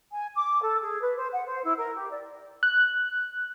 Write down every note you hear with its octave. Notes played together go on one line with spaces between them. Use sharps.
G#5
D6
A4
G#4
B4
C5
F#5
C5
E4
A#4
G4
D5
F#6